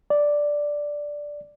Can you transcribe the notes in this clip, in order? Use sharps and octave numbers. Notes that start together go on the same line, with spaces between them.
D5